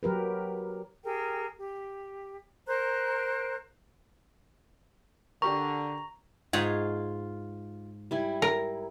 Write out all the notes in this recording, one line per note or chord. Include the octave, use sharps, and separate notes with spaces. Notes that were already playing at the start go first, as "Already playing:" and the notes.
F#3 G4 A#4 B4
G4 G#4 A#4 G5
G4
A#4 C5 A#5 F#6
D3 D4 G4 A#4 A#5 C#6
G#2 F4 G#4 C#5
G3 E4 G#5
A#4